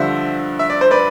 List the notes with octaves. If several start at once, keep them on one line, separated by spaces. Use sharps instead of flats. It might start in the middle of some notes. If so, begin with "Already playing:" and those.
Already playing: G2 D3 F3 C5 E5
E5
D5
C5
B4 D5